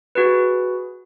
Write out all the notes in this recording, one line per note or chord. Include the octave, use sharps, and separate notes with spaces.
F#4 G#4 B4